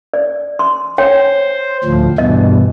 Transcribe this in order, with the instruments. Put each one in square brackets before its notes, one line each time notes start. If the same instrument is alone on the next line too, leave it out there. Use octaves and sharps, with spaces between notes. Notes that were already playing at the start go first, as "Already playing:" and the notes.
[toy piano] D5
C6
[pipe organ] C5 [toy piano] C#5 G5
[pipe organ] D2 A2 F3
[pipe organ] G2 B2 E3 [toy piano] D#5